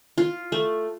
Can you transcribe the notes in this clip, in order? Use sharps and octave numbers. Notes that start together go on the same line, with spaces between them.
F4
A3